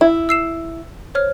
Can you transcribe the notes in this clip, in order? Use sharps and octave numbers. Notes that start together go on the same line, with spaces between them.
E4
E6 C7 E7
C5 C#5 F6